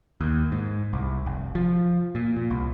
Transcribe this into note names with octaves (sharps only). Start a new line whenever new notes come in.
D#2
G#2
C2
F1
F3
A#2
A#2
C2